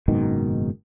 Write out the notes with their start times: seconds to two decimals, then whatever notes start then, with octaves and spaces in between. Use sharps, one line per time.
0.08 F#1 G#2 B2 D#3